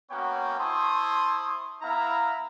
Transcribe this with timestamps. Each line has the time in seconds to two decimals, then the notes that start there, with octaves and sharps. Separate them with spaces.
0.11 A#3 B3 C#4 F#4 C#5 G5
0.58 E4 C5 A5 C6 C#6 D#6
1.82 B3 E4 E5 F5 A#5